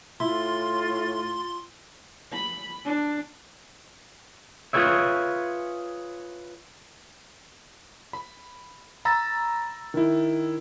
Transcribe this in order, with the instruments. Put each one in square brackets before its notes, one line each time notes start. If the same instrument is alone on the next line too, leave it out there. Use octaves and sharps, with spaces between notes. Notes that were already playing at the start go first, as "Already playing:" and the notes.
[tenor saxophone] A2 [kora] E4 [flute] F4 [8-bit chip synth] C6
[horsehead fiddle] B5
D4
[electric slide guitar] F4 G#4 B4 C#5 E5
[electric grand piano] B5
A#5 B5 E6 A6
D#3 E4